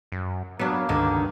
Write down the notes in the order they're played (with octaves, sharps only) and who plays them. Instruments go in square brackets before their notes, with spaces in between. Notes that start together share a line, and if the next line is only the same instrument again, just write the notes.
[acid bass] F#2
[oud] F#3 D4 [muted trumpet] A#3 [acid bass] B3
[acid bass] C#2 [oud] G2 D3 D#3